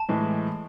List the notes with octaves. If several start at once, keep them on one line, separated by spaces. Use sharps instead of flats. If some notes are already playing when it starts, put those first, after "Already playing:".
Already playing: A5
A2 E3 G#3